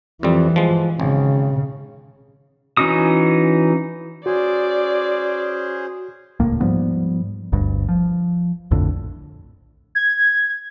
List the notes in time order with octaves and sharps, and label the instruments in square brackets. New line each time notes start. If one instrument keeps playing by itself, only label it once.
[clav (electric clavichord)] F2 G3 [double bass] E3
[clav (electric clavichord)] F3 G#3
[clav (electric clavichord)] G#1 [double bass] C#3
[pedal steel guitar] E3 C#4 D#4 F#4 D#6
[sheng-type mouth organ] C#4 G#4 C5 [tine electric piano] F#4 [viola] D5
[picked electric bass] D#1 C#2 A2 A#3
G#2 F3 G3 B3
G1 D2 G2
F3
A#1 F2 A2 D3
[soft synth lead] G#6